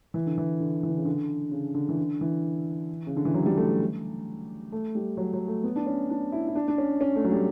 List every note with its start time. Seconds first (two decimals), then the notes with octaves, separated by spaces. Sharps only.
0.14 E3
0.27 D3
0.38 E3
0.60 D3
0.83 E3
0.90 D3
0.98 C#3
1.05 D3
1.51 C#3
1.75 D3
1.89 E3
1.97 D3
2.21 E3
3.07 C#3
3.17 D3
3.25 E3
3.34 F#3
3.46 G3
3.57 A3
4.72 A3
4.95 G3
5.17 F#3
5.33 F#3
5.48 A3
5.63 B3
5.76 D4
5.87 C#4
6.10 D4
6.32 E4
6.48 E4
6.55 D4
6.68 D4
6.78 C#4
7.01 C#4
7.16 A3
7.24 F#3
7.32 G3